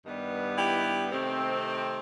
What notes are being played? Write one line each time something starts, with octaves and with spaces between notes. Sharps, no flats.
G2 D#3 G3 B3
E4 G4
C3 D#3 A3 C4